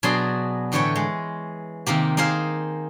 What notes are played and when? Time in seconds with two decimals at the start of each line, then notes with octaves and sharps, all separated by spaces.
0.03 B2 F#3 D4 G#4 D5 C6
0.72 A2 D3 E3 B4 C#5 G5
0.96 G#3
1.86 C3 D#3 A#3 G4
2.17 A#3 D#4 G#4 C5 F5